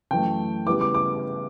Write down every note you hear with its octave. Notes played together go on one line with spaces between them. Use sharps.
F#2 E3 A3 G5
C#3 G3 B3 E4 D6
D6
D6